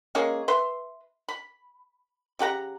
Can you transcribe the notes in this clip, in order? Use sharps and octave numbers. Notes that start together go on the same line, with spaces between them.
G#3 A#3 C#4 G#4
B4 E5 C6
B5
C#3 G4 F#5 A#5